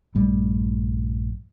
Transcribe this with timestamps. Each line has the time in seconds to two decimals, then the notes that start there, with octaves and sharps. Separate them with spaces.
0.15 A#1 G2 G3 A3